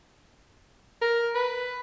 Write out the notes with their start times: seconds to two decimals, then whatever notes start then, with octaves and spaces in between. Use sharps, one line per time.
1.01 A#4
1.35 B4